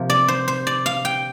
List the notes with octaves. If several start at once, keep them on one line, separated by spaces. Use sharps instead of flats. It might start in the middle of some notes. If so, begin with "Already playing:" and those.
Already playing: C3 F3 A#3
D5
C5
C5
D5
F5
G5